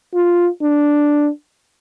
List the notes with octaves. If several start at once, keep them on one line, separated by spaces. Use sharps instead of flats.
F4
D4